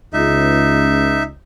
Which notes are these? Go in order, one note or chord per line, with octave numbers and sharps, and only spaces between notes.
C#2 D#4 E5